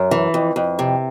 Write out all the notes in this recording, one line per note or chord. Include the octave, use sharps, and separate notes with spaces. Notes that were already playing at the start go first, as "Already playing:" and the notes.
Already playing: F#2
E3
F2
F2
C3